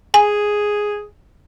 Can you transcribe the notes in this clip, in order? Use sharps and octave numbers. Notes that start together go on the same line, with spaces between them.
G#4 G#5